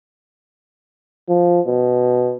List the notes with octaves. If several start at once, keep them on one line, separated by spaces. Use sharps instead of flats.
F3
B2